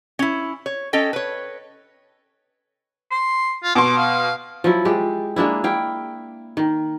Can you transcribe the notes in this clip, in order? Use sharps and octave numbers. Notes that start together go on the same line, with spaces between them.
C#4 E4
C#5
C#4 A4 D#5 G5
B4 C#5
C6
F4
B2 C6 D6
F5
F3 F#3 E4
G#3 G4
G#3 A#3 D4 E4
E4 F5 G5
D#3